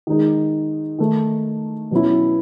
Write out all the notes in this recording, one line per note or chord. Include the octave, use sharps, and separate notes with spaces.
D#3 G#3 D#4
D#3 A3 D#4
B2 F#3 C#4 E4